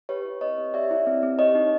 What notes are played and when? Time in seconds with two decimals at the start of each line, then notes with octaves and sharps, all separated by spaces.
0.09 G4 B4 C#5
0.25 E4
0.41 C4 C#5 D#5
0.58 C4
0.73 G4 D5 E5
0.91 E4
1.07 C4
1.23 C4
1.39 G4 C#5 D#5
1.55 D#4